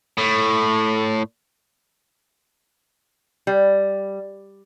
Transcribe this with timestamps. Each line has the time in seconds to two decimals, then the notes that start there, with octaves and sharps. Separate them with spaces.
0.18 A2
3.47 G3